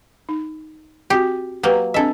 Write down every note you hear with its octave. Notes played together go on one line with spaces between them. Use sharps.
D#4
C4 F#4 G4
F#3 A#3 G4 B4 G5
C4 D4 A4 D#5 E5